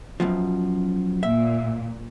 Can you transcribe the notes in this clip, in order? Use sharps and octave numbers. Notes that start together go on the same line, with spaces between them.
F#2 B2 F3
A#2 E5